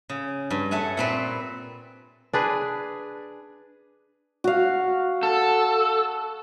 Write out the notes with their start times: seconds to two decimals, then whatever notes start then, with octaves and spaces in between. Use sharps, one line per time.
0.09 C#3
0.50 G2
0.71 A4 C#5 E5 F#5 G#5
0.97 A#2 C4 B4
2.33 D4 G#4 B4
4.44 F#4 F5
5.23 A4